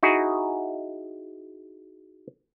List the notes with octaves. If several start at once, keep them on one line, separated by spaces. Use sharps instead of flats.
D#4 E4 F#4 G#4